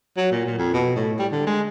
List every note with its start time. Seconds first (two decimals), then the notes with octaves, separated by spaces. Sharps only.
0.17 F#3
0.32 A#2
0.46 A#2
0.58 F2
0.73 B2
0.96 A2
1.19 G3
1.32 D3
1.47 G#3